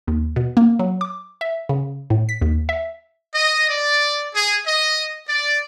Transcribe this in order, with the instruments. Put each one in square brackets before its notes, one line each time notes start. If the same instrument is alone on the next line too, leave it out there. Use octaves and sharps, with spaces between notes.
[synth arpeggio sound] D#2
B2
A#3
F#3
D6
E5
C#3
A2
B6
D#2
E5
[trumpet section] D#5
D5
G#4
D#5
D5